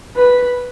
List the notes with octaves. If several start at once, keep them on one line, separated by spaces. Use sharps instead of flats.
B4